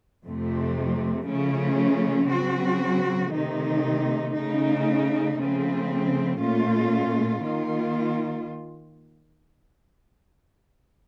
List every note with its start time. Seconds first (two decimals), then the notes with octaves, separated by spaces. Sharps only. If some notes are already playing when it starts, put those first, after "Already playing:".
0.24 F2 C3 F3 A3
1.26 C#3 F3 A3 C#4
2.29 C#3 F#3 C4 F#4
3.32 C3 D#3 A3 D#4
4.35 C#3 A3 D#4
5.37 C#3 F3 A3 C4
6.39 A#2 A3 C#4 F4
7.42 D#3 A#3 F4